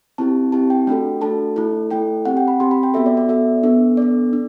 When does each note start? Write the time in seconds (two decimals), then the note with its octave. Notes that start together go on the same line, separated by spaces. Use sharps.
0.18 C4 E4 G4 A5
0.52 C4 E4 G4 A5
0.70 G5
0.87 A3 D4 F#4 A4 G5
1.21 A3 D4 F#4 A4 A5
1.56 A3 E4 A4
1.91 A3 E4 A4 G5
2.25 C4 G4 F#5
2.37 G5
2.48 B5
2.60 C4 G4 C6
2.71 B5
2.83 G5
2.94 B3 F#4 A4 E5
3.06 D5
3.17 D5
3.29 B3 F#4 A4 E5
3.63 B3 D4 A4
3.97 B3 D4 A4 D5
4.33 D4